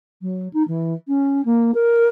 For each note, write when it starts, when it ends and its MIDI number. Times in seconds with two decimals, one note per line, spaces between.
0.22 0.48 54
0.53 0.63 63
0.68 0.94 52
1.08 1.42 61
1.45 1.74 58
1.74 2.08 70